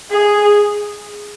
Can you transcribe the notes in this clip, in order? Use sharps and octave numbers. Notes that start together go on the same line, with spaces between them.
G#4